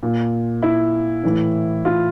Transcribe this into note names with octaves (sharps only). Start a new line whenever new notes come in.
A#2
E4
A2 E3
F4